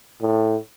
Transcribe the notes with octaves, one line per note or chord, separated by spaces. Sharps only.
A2